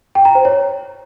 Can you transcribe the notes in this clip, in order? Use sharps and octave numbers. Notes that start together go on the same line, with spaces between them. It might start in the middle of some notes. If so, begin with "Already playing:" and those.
G5
A#5
C5
C#5